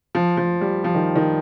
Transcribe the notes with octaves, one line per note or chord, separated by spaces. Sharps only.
F3
F3
G3
F3
D#3
D#3